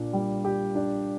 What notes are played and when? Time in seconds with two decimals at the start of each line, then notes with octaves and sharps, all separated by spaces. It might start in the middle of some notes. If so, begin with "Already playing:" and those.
Already playing: A#2 D4
0.13 G3
0.45 G4
0.75 D4